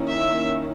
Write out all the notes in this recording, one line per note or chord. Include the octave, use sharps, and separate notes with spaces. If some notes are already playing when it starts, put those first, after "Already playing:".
Already playing: D#3 A#3 C#4 E4
E5